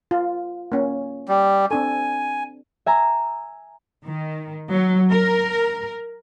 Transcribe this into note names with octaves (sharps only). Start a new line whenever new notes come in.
F4
A#3 C#4
G3
C4 D4 A4 G#5
E5 G#5 A#5
D#3
F#3
A#4